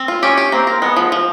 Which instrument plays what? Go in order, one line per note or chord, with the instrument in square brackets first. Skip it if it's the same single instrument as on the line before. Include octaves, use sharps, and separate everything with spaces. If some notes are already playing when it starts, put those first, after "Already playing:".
Already playing: [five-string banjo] C4
F4
[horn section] C#4 [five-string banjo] G4
[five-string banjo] G4
[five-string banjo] A#3 [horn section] C4
[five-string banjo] A#4
[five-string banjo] G#3 [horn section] B3
[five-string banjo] F3
F3